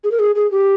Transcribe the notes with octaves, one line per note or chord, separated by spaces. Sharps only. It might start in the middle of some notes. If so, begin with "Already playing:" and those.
G#4
A#4
G#4
G#4
G4